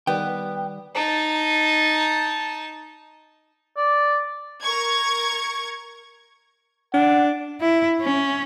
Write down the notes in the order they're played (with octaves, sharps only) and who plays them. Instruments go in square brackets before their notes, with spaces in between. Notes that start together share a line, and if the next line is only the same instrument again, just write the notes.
[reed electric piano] D#3 G3 D5 [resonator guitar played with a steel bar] B3 [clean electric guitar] G5
[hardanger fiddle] D#4 A5
[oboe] D5
[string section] A#4 C#6 G#6
[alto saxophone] D4 [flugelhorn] F#5
[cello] E4
C#4